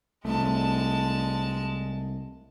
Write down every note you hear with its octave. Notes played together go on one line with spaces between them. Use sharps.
C2 G#3 A3 A5